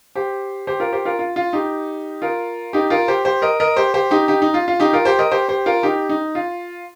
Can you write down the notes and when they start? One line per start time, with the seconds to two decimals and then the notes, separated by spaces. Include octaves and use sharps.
0.15 G4 C5
0.67 G4 C5
0.80 F4 A#4
0.93 G4 C5
1.05 F4 A#4
1.19 F4
1.36 F4
1.53 D#4 G4
2.22 F4 A#4
2.73 D#4 G4
2.90 F4 A#4
3.08 G4 C5
3.25 G4 C5
3.42 A#4 D#5
3.60 A#4 D#5
3.77 G4 C5
3.94 G4 C5
4.11 D#4 G4
4.28 D#4 G4
4.42 D#4
4.54 F4
4.68 F4
4.80 D#4 G4
4.93 F4 A#4
5.05 G4 C5
5.19 A#4 D#5
5.31 G4 C5
5.49 G4 C5
5.66 F4 A#4
5.83 D#4 G4
6.09 D#4
6.35 F4